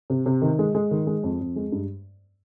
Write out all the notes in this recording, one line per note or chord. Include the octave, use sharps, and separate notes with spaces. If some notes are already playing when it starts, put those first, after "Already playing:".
C3
C3
D#3
G#3
G#3
D#3
G#3
F2
F2
G#3
G2